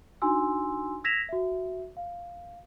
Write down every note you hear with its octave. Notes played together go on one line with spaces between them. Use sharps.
D4 D#4 F#4 G#5 C6 E6
E6 G#6 A#6 B6 E7 F7
F#4 E5
F5